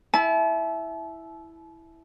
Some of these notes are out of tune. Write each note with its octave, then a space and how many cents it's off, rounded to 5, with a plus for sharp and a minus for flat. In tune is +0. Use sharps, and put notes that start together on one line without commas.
E4 +0 A5 -40